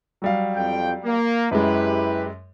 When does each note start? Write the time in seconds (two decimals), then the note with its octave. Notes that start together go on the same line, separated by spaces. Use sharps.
0.22 F#3 G3 F5
0.56 F2 G5
1.05 A#3
1.51 F#2 G#3 E4 G4 B4